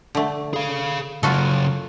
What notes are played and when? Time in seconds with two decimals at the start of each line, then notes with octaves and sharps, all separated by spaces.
0.15 D3 A3
0.54 G#4 F5
1.23 C#3 F#3 F4 F#4 A4